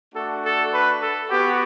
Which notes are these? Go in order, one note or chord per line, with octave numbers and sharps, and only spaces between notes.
A3 D4 F#4 A4
A4
B4
A4
B3 F#4 G4